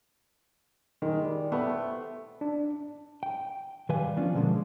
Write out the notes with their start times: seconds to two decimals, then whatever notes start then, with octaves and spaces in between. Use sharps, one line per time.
1.02 D#3 G#3
1.25 G3
1.52 A3 B3
1.69 C5
2.41 D4
3.23 G5
3.89 D#3 G3 B4 F5 G#5
4.17 F3 B3 C#4 D4 F4
4.35 B2 D3 F3 G#3 A#3